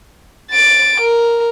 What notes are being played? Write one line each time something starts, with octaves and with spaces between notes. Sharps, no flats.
A6 D7
A#4